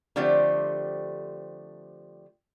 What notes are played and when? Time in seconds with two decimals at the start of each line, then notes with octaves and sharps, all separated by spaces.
0.16 D3 F3 G3 A3 C4 G4